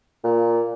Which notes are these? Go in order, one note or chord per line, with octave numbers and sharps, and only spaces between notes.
A#2